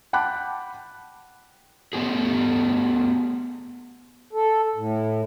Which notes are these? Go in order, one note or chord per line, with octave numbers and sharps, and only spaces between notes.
F#5 G5 A5 B5 D6 F#6
A3 B3 G4 G#4
A4
A2